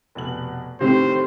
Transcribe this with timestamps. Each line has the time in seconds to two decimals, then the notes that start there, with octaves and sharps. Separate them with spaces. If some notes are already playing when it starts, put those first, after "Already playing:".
0.15 F1 B2 F#7
0.81 A2 D#3 E3 C4 G4 C5